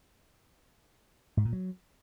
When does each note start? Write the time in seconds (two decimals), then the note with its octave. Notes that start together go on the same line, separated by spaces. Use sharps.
1.37 G#2
1.45 A#2
1.53 F#3